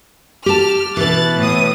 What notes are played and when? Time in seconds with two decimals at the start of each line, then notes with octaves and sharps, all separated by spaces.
0.46 G4 A5 F6
0.97 B2 E3 F#6 A6
1.37 A2 D#6